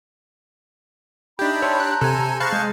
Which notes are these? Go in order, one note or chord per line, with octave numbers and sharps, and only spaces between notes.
D4 D#4 G4 E5 B5 G6
C#5 A5 C6 E6
A#5 F#6
C3 A4 G#5
G#4 C5 F5 A5 B5 C#6 F#6 A#6
G#3 G#4 G6